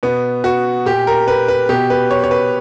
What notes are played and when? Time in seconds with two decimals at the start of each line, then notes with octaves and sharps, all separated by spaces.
0.03 B2 B3
0.44 F#4
0.85 A#2 G4
1.07 A#4
1.28 B4
1.48 B4
1.69 B2 G4
1.90 B4
2.11 C#5
2.24 C#5
2.31 B4